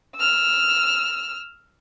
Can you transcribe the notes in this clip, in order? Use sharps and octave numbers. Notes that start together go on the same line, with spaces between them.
E6 F6